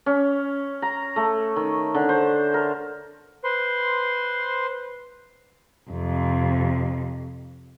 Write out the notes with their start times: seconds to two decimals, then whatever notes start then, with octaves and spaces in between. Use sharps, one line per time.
0.06 C#4
0.82 A#5
1.16 A3
1.56 D#3
1.95 D3
2.09 C5
2.54 A#4
3.44 B4 C5 C6
5.90 F2 C3